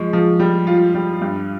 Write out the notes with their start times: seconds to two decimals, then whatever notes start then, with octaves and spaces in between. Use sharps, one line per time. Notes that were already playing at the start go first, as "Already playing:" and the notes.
Already playing: F3 G#3 G#4
0.13 F3
0.40 G3
0.67 F4
0.95 G3
1.21 G2